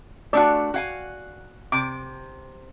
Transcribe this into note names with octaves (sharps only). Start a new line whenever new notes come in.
A3 D4 F#4 D5
F#4 F5 G#5
C3 D6